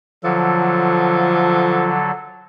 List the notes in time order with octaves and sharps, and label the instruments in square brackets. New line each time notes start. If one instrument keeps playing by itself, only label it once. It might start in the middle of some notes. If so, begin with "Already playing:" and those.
[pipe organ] D3 F#3 A4 [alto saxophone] F3